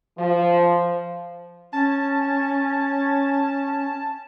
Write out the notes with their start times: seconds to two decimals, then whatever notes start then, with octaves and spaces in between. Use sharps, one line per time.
0.17 F3
1.73 C#4 A5